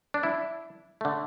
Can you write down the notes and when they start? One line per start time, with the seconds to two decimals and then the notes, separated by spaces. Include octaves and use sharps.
0.14 D4
0.23 E4
1.01 D3 A3